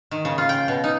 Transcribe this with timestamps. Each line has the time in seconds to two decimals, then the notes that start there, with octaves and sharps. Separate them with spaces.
0.11 D#3
0.25 C#3
0.38 F4
0.49 G5
0.68 B2
0.84 D#4